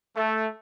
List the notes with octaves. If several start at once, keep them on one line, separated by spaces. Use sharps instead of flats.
A3